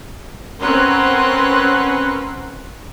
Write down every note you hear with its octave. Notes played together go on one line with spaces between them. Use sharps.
C4 C#4 A#4 B4 F#5 C6